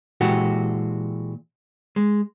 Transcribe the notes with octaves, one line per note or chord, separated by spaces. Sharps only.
A#2 E3 G#3 F#4 G4 A4
G#3